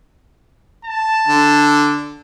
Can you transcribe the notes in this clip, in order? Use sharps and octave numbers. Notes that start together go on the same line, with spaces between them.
A5
D3